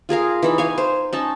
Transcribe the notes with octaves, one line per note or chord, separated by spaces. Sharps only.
F4 G#4 A#4 F5
E3 D#4 B5
C#5 F5 G#5
C5
C#4 D#4 A5